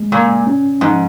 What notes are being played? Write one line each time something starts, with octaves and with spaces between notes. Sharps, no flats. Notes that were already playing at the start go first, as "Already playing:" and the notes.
Already playing: G#3
A#2 C#3
C#4
G#2 F3